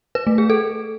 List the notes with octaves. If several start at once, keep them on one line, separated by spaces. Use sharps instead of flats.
B4
A3
G#4
A4